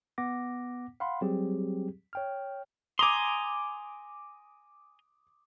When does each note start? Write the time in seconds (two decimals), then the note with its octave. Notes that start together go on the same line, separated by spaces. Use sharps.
0.18 B3 F#5 D6 A#6
1.00 F5 F#5 B5 C6
1.21 F#3 G3 C4 G4 G#4
2.13 C#5 G5 F6
2.99 G#5 A#5 C6 D6 D#6